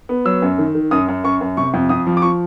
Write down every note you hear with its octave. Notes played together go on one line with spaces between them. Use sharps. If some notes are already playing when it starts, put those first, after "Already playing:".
B3
F#3 E6
F#2
D#3
D#3
F#2 D#6
F#2
F#2 C#6
F#2
C3 C#6
F2
F2 D#6
F3
D6
F3 C#6